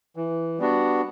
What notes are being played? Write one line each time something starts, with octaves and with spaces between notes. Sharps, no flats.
E3
G3 B3 D4 F#4